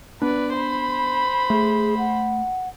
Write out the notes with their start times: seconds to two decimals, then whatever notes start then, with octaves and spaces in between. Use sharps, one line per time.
0.22 B3 D4 B4 D5
0.56 C5 B5
1.50 A3 G#4
1.98 F#5